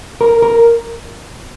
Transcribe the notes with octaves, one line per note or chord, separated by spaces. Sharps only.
A#4
A#4